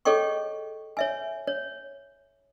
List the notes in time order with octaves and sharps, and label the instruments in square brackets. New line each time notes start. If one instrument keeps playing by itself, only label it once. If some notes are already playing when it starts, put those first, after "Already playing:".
[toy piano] G#4 A4 C#5 D#5 G5 C#6
C#5 E5 G#5
C#5